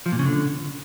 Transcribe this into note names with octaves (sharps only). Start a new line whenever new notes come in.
F3
A#2
C#3
D3